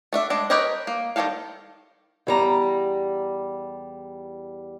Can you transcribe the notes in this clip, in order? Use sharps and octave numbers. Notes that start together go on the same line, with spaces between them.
A3 D4 E5
G#3 D4
G4 A#4 B4 C#5 D#5
A#3
D#3 F#3 G3 A4 F5
E2 G3 A#5